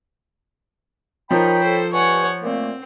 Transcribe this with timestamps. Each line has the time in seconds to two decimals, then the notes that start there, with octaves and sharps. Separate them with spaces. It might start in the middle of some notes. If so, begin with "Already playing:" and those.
1.31 F3 D#4 A#4 C#5 G5 B5
1.63 A4 C5
1.93 G2 C#5 F#5 G#5 C#6
2.43 A#2 A3 A#3 C4